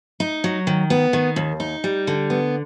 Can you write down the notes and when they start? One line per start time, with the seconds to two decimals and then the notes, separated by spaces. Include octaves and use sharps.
0.20 D#4
0.44 F#3
0.67 D#3
0.90 B3
1.13 D#3
1.36 D#2
1.60 D#4
1.84 G3
2.07 D3
2.30 B3